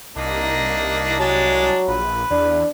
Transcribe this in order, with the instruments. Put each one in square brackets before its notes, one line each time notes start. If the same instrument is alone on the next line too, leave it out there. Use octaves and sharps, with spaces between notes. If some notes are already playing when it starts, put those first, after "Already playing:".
[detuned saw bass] C2 [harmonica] A#3 D4 D#4
[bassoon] F#3 [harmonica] G#3 D4 A5
[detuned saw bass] A#1 [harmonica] B4
[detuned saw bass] E2 [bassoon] D4